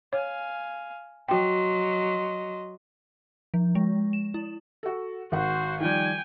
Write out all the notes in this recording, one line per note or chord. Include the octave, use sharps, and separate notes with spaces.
C#5 F5 G#5
F#3 F#4 D#5 G5 C6
F3
G#3
E7
E4
F#4 A4
G#1 F#4 C5 F#5
D#3 F3 G3 G5 G#5